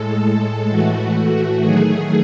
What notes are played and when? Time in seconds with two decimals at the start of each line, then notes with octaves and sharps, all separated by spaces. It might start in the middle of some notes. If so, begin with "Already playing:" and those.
Already playing: A2 G#3 A4
0.69 A2 E3 A3 F#4
1.16 F#4
1.62 D#3 F#3 A3 G#4